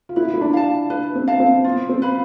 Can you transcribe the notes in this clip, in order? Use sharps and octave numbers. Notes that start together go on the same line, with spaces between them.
F4
E4 B4
E4
D4
F5 A5
D4 B4
C4
F5 A5
C4
B3 F4
C4
B4 F5 B5